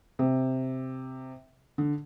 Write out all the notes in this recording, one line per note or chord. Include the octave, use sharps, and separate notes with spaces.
C3
D3